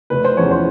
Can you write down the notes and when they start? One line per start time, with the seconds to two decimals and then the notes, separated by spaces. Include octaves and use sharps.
0.10 F1 B4
0.25 C5
0.37 E2 C#3 F3 C#5
0.51 C5